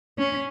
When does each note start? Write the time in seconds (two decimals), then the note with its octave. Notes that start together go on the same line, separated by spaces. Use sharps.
0.18 C#4